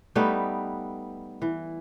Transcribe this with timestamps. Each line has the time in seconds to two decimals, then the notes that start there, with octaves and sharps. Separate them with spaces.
0.15 G3 A3 B3 D#4
1.42 E3